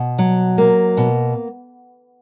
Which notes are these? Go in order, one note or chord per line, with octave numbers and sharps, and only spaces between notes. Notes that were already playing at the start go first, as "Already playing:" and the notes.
Already playing: B2
F#3
A#3
B2